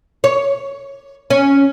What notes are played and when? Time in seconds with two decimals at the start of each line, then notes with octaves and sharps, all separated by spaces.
0.24 C#5
1.30 C#4